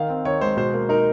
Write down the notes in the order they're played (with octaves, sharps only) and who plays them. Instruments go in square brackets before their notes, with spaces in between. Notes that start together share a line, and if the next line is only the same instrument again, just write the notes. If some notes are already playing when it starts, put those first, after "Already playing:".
Already playing: [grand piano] D#3 F5
C4
D#3 C#5
G#3 C5
B2 C5
A#3
D#4 A#4